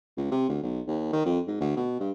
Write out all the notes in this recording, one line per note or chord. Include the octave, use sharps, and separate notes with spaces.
C#2
C3
D2
B1
D#2
D#3
F2
G#2
D2
B2
G2